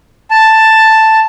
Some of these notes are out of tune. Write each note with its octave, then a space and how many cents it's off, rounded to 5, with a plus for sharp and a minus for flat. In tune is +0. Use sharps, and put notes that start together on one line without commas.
A5 +5